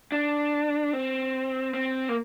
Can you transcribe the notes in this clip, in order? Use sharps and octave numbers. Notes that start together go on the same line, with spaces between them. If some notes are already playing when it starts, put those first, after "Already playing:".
D4
C4
C4
A#3